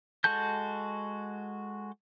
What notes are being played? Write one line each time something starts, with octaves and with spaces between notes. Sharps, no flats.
G#3 F#4 A4 A5 G6